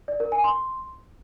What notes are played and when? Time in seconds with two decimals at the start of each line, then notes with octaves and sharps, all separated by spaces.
0.08 D5
0.20 A#4
0.32 G#5
0.44 C6